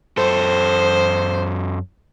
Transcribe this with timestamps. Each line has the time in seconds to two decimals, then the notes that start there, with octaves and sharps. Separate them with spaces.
0.17 F#2 A4 C5